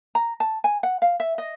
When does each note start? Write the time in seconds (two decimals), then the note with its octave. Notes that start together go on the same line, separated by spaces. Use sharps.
0.15 A#5
0.40 A5
0.64 G#5
0.83 F#5
1.02 F5
1.20 E5
1.38 D#5